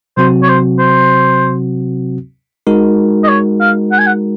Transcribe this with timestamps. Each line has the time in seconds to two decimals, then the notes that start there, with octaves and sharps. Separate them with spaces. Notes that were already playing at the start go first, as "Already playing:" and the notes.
0.17 C3 F#3 C4 F#4 C5
0.42 C#5
0.49 C5
0.79 C5
2.67 G#3 D#4 F#4 A#4
3.24 D#5
3.29 C#5
3.61 F5
3.92 F#5
3.99 G#5
4.06 F#5